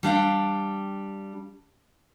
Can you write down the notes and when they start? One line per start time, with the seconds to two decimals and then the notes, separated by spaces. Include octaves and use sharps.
0.03 G3 D4 F5 G5